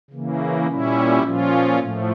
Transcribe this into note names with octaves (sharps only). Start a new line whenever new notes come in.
C#3 E3 A#3
A#2 G3 C#4 E4
A#2 F3 C#4 F4
A2 F3 A3